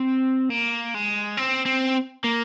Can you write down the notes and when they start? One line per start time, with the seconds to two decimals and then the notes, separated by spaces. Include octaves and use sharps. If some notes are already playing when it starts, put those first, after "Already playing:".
Already playing: C4
0.50 A#3
0.95 G#3
1.37 C4
1.66 C4
2.24 A#3